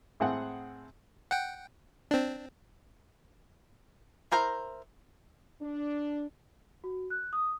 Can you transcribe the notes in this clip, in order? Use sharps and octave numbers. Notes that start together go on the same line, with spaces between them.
A2 C4 G#4 F#5
F#5 G5
C4 D4
E4 A#4 C5 A#5
D4
F#4
F#6
D#6